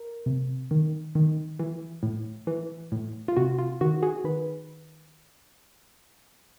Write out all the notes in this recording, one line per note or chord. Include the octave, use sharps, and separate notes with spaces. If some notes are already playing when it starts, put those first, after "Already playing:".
Already playing: A#4
C3
D#3
D#3
E3
A2
E3
A2
F4
C3 F#4
F4
D#3 F#4
F#4 G#4
D#3 B4